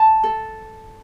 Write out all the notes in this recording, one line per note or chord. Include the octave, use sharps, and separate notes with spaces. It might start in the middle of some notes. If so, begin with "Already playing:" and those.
Already playing: A5
A4